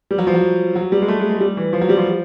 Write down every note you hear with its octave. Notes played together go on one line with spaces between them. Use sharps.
G3
F#3
F3
F#3
F#3
G3
G#3
A3
G#3
G#3
G3
E3
F3
F#3
G3
F3